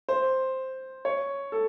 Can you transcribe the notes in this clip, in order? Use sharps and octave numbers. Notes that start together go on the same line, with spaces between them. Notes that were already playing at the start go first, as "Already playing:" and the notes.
C5
C#5
A4